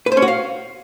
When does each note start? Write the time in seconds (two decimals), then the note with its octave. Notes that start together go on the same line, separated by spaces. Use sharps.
0.06 B4
0.12 C5
0.17 C#4
0.22 F#4
0.28 F5